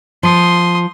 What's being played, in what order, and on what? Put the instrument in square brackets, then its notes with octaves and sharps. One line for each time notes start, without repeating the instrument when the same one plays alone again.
[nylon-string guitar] F3 [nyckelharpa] C6 D#6